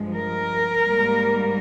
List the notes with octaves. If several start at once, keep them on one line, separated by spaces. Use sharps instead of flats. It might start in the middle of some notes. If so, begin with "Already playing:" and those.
Already playing: G2 F3 G#3
A#4
G#2 G3 A#3